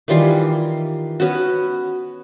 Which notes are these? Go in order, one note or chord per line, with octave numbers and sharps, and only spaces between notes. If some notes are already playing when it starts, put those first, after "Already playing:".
D#3 E3 G3 F4
B3 C#4 F#4